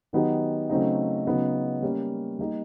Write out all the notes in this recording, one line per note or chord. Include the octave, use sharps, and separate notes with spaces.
D#3 F#3 B3 D#4 G4
C#3 F#3 A3 C4 D#4
C#3 F#3 B3 D#4
G3 A#3 C#4
G3 A#3 D#4 G4